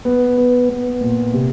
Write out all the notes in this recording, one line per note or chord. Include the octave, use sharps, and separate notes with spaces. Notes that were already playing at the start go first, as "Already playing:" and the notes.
B3
B3
B3
A#2
C3